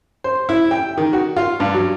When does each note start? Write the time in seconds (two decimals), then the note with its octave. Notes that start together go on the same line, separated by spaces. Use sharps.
0.24 C5
0.49 E4
0.71 G5
0.98 D#3
1.13 F#4
1.36 F4
1.60 G2
1.74 F#3